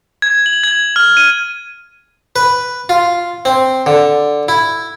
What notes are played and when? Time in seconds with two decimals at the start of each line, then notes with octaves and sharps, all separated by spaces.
0.22 G#6
0.46 F#7
0.64 G#6
0.96 F6
1.17 D#7
2.36 B4
2.89 F4
3.45 C4
3.86 D3
4.48 E4